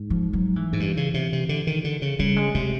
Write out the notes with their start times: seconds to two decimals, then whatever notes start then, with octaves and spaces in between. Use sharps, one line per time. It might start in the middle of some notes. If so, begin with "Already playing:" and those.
Already playing: G#2
0.10 F3
0.33 F#3
0.56 E3
0.73 G#2
0.80 G2
0.97 C#3
1.14 C3
1.33 C3
1.49 D3
1.67 D#3
1.84 D3
2.02 C#3
2.19 C#3 G3
2.36 G#3
2.54 C3 G#3